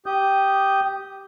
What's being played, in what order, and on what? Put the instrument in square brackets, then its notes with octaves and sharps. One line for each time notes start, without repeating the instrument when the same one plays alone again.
[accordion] G4 D#6 G6